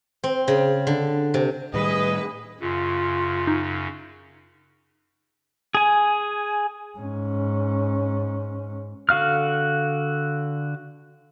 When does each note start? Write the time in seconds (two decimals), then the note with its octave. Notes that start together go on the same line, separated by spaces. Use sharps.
0.24 C4
0.48 C#3
0.87 D3
1.34 C3
1.74 A2 D#3 G3 G#4 B4 D#5
2.60 F#2 C#3 F4
3.47 D#4
5.75 G#4 G#5
6.99 G#2 C#4
9.09 D3 F#4 F5 F6